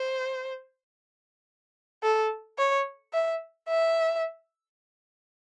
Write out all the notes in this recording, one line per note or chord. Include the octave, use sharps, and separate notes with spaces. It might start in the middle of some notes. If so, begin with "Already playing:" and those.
Already playing: C5
A4
C#5
E5
E5